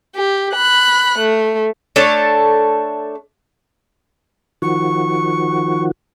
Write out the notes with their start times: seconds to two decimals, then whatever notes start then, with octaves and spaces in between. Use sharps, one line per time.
0.15 G4
0.54 B5 F#6
1.18 A3
1.96 A3 D4 A4 C#5
4.62 D#3 F3 F#4 C#6